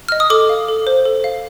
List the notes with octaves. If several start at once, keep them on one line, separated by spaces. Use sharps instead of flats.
D#5 F6
D#6
A4 D6
F5
A4
C5
A4
F5